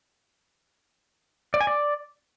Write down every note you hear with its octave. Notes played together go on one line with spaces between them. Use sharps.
D5
G#5
D5